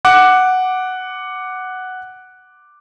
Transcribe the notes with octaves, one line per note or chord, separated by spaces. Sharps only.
F#5 D6 F#6